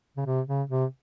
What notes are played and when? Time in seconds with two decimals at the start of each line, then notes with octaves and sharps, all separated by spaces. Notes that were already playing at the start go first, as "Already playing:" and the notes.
0.17 C#3
0.26 C3
0.48 C#3
0.70 C3